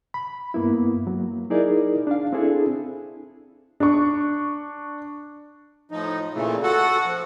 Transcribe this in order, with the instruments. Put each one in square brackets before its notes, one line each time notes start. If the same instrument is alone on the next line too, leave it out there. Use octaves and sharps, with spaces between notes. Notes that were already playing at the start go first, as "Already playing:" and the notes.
[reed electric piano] B5
G2 A#3 B3 E4
F#3 A#3
D#4 E4 G#4 A#4 D5
D4 F5
C4 D4 E4 G#4 A4
[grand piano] D4 C#6
[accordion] A2 F3 D#4
A#2 C#3 E3 A3
F#4 A4 F#5
F3